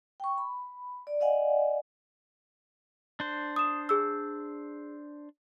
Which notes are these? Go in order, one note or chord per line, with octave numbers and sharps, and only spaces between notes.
G5 C#6
B5
D5
D5 D#5 F5 F#5 G#5
D4 C5
D#6 E7
G#4 E6